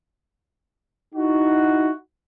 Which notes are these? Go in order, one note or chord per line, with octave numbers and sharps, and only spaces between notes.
D#4 E4 F#4